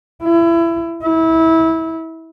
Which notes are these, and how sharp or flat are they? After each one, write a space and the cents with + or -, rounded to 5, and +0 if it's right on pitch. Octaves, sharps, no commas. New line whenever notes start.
E4 +25
E4 -25